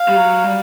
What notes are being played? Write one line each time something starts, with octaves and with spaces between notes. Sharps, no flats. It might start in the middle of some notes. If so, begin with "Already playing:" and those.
Already playing: F5
G3
F#3
G3